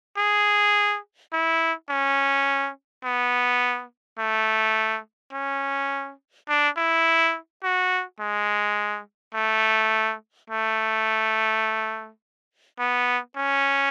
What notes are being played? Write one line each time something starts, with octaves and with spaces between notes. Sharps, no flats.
G#4
E4
C#4
B3
A3
C#4
D4
E4
F#4
G#3
A3
A3
B3
C#4